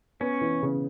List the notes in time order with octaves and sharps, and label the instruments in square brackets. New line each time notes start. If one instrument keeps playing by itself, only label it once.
[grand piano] B3 [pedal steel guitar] C#4
[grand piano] E3
C#3